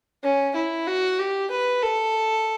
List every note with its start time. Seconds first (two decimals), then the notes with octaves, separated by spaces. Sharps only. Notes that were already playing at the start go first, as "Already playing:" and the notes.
0.24 C#4
0.56 E4
0.87 F#4
1.19 G4
1.51 B4
1.83 A4